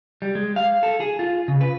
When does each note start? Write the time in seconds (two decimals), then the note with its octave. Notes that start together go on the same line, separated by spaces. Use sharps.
0.22 G3
0.35 G#3
0.56 F5
0.83 A4
1.00 G#4
1.19 F4
1.48 C#3
1.61 B4